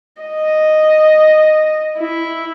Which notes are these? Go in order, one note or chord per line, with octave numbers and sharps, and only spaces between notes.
D#5
E4